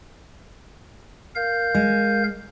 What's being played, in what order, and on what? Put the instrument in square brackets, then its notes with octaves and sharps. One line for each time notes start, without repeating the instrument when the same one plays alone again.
[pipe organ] A#4 F5 G6
[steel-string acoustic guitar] G#3